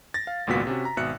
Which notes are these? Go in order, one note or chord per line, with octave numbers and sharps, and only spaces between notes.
A6 A#6
F5
G#1 C#2 A#2 B3 F#4 B6
C3 C#4 F#4
A#5
G#1 B2 E5 F#6 C#7